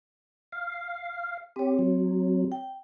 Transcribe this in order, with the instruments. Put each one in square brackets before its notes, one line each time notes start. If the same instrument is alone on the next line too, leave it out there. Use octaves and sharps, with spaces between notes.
[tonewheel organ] F5
[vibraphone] C4 C#5 [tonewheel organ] G4
[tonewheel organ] F#3
[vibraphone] G5